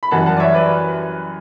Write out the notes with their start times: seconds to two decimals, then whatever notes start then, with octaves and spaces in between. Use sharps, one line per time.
0.03 B5
0.11 F#2 E3 G3 F#5 A5
0.26 F#5 A5
0.36 D5
0.40 C#5 E5
0.54 B4 D5
0.69 B4